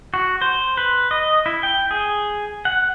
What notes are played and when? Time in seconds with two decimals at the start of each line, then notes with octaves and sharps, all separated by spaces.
0.14 F#4
0.42 C5
0.77 B4
1.11 D#5
1.46 E4
1.63 G5
1.91 G#4
2.65 F#5